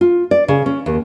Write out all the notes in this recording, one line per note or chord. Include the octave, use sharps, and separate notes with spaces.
F4
D5
C#3
C#4
D#2